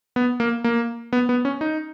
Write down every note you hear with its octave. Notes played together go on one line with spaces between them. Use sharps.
B3
A#3
A#3
B3
B3
C#4
D#4